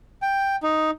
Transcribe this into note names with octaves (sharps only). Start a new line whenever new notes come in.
G5
D#4